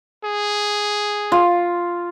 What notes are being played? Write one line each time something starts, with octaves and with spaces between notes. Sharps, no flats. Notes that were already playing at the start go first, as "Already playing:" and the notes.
G#4
F4